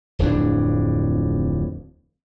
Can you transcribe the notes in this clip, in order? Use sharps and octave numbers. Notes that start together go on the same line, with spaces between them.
D1 F2 A2 D4